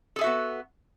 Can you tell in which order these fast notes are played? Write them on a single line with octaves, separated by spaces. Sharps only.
A4 G#4 E5 F#4 B3